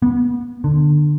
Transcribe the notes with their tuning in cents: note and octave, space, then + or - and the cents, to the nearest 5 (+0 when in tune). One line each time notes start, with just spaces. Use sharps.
B3 -30
D3 +25